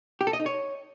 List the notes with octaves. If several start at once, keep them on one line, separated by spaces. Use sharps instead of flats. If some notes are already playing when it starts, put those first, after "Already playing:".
G4
A4
D#5
D#4
C#5